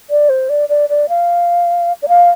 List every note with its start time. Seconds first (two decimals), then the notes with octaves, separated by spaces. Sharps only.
0.10 D5
0.29 C5
0.49 D5
0.69 D5
0.89 D5
1.09 F5
2.02 D5
2.08 F5